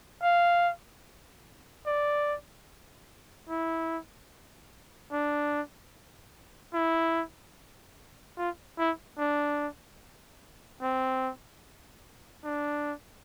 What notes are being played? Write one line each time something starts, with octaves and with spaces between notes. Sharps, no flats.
F5
D5
E4
D4
E4
F4
E4
D4
C4
D4